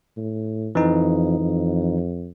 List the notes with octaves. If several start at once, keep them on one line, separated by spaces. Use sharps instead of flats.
A2
F2 E3 D#4
F2